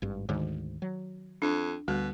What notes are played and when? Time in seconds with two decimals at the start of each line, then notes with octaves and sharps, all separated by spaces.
0.02 G#1 G2
0.29 D2 G#2 D#3
0.82 F#3
1.42 F2 D4
1.88 D2 B2 G3